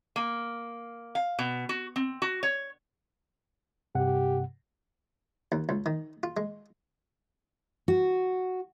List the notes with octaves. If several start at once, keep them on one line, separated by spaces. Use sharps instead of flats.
A#3
F5
B2
F#4
C4
F#4
C#5
G2 C3 G4 F#5
D#2
C#2
D#3
F4
G#3
F#4